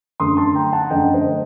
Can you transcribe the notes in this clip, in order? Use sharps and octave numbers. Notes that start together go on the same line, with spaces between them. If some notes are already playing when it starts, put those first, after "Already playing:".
F#2 D3 A3 C6 D#6
A5 C6
G5 A#5
F#5 A5
F#2 D3 A3 D#5 G5
C5 D#5